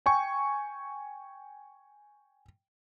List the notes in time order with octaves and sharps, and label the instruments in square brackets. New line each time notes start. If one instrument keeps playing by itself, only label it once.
[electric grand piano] G5 G#5 C#6